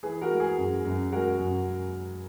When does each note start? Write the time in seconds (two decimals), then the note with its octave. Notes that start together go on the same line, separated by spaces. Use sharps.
0.03 E3 G#4 B4
0.22 F#4 A#4
0.30 G#3
0.40 G#4
0.58 F#2
0.85 F#2
1.12 G#3 F#4 A#4
1.39 F#2